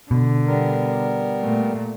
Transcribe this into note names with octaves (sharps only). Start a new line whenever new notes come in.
B2 D3
G3 B3 A#4
A#2 A3